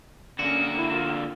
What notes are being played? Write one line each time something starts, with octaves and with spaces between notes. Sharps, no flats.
D3 A#3 C#4 F#4
E4
F4